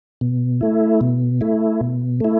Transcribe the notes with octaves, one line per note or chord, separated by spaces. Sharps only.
B2
A3 E4
B2
A3 E4
B2
A3 E4